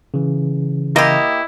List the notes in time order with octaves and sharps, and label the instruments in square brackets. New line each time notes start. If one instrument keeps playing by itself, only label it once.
[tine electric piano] C#3 E3
[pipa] A#3 G4 [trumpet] E4 [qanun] D#5